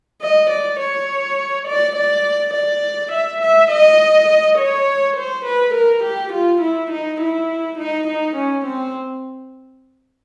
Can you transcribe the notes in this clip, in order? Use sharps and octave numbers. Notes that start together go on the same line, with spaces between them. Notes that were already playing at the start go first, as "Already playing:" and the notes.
D#5
D5
C#5
D5
D5
D5
E5
E5
D#5
C#5
C5
B4
A#4
G4
F4
E4
D#4
E4
D#4
D#4
C#4
C4